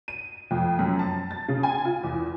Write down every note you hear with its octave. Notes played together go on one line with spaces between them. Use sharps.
D#7
F2
F#2
A5
A6
C#3
G#5
F4
E2